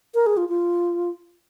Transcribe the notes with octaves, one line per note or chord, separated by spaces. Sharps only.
A#4
G#4
F4
F4